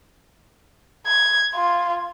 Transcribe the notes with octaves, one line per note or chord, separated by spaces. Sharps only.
G#6
F4